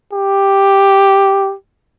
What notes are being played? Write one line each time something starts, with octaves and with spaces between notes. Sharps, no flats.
G4